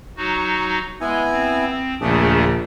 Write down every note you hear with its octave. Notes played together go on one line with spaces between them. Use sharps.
F#3 D#4 F#4
G#3 B3 E4 G#5
C4
A#1 D#2 C#3 A3 D4 G#4